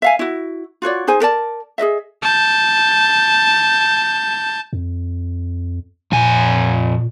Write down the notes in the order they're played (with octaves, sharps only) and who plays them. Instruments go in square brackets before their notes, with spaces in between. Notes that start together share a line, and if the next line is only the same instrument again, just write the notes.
[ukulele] E5 F5 G#5
E4 F#4
F4 F#4 C#5 D5
D#4 G#4 C5 G#5
A4 A#4 D5 A5
G#4 A#4 D#5 E5
[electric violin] A5 G6
[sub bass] F2
[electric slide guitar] F2 G#5 [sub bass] A#2